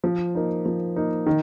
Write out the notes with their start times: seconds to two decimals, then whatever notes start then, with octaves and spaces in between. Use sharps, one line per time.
0.04 F3
0.35 A#3 D#4
0.66 F3
0.96 A#3 D#4
1.26 D#3